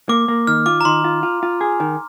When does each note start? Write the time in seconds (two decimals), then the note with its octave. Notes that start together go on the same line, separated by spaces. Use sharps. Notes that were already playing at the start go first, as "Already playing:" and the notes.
0.09 A#3 D6
0.28 A#3
0.47 D#3 F6
0.66 F4 D6
0.81 A#5
0.85 D#3 C6
1.04 F4
1.23 F4
1.43 F4
1.61 G#4
1.80 D#3